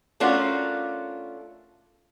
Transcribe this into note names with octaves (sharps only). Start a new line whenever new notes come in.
A3 C#4 D4 F4 F#4 A#4